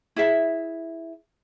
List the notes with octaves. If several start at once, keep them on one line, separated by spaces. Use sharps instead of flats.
E4 G#4 E5